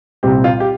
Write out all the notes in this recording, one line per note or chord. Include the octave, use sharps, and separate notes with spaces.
C2 A#2 G3 C4 G4
F4
G4